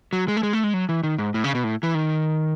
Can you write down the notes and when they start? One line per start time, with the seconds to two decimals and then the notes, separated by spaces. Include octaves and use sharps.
0.13 F#3
0.28 G#3
0.37 A3
0.43 G#3
0.53 A3
0.64 G#3
0.74 F#3
0.89 E3
1.03 D#3
1.19 G#2
1.34 A2
1.44 C#3
1.55 B2
1.64 A2
1.83 E3
1.95 D#3